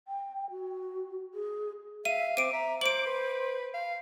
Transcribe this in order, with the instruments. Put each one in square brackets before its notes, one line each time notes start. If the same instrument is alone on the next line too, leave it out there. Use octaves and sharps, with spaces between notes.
[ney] G5
F#4
G#4
[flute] E5 [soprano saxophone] F5 [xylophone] D#7
[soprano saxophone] C4 [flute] D6 [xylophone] D7 D#7
[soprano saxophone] E5 [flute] A#5
[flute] C5 [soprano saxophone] D6 [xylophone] D7 F#7
[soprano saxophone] B4
F5